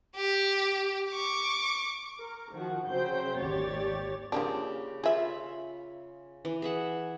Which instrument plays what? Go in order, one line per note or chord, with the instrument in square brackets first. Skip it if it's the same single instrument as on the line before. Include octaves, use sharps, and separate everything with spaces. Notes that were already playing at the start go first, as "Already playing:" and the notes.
[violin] G4
C#6 D6
[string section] A#4
D#3 F3 F#4
C#3 F#3 C5 G5 G6
G#1 D#2 G4 C#5 D5 A6
[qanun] C#3 G4 [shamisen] F3 A#3 D4
[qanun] F4 B5 [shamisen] G#4 E5
[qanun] E3
G#4 E5 F#5